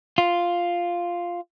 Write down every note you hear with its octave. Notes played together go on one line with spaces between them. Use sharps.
F4